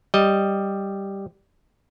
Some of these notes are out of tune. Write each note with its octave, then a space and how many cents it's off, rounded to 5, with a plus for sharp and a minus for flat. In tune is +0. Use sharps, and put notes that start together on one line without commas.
G3 +0 D#5 +0